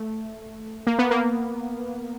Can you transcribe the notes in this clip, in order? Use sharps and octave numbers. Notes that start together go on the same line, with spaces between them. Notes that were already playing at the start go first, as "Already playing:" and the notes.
Already playing: A3
A#3
B3
A#3